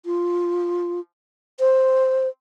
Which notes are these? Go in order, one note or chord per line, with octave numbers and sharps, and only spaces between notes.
F4
C5